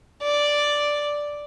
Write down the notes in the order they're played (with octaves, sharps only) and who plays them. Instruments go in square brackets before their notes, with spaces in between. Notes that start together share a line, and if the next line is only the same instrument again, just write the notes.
[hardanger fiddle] D5